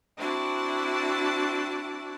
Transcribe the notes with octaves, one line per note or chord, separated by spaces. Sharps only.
C4 D4 E4 F#4 D5 A5